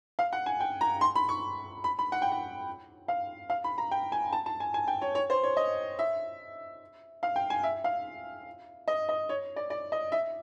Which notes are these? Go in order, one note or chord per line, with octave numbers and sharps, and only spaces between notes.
F5
F#5
G#5
G5
A#5
C6
B5
C#6
B5
B5
F#5
G5
F#5
F5
F5
B5
A#5
G5
G#5
A5
A5
G#5
G#5
G5
C#5
C#5
C5
C#5
D#5
E5
F5
G5
G#5
E5
F5
D#5
D#5
C#5
D5
D5
D#5
E5